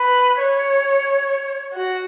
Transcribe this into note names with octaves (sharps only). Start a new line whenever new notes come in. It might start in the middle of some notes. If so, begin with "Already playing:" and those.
Already playing: B4
C#5
F#4